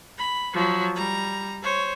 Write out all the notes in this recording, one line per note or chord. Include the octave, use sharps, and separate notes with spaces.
B5
F3 F#3
G3 A#5
C5 C#5